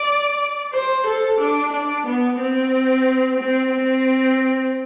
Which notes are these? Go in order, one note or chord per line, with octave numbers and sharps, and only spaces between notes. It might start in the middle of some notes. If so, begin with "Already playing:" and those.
Already playing: D5
C5
A4
D4
D4
B3
C4
C4
C4